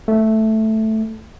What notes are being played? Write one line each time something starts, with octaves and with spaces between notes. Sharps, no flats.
A3